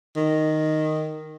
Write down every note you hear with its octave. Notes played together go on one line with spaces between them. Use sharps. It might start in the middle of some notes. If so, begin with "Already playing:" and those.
D#3